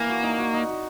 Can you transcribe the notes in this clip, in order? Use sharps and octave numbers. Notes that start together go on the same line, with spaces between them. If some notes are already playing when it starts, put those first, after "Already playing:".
Already playing: E3 A#3
F#4
D#4
F#4
D#4
F#4